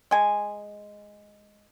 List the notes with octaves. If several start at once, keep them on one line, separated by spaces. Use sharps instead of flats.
G#3 G#5